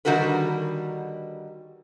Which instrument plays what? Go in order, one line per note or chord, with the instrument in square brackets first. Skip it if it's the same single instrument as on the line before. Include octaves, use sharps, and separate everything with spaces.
[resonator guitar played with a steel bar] D3 D#3 G3 F#4 A#4 B4